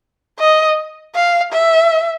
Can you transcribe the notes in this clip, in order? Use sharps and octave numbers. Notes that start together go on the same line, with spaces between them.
D#5
F5
E5